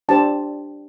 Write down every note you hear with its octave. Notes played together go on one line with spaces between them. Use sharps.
D4 G4 C5 A5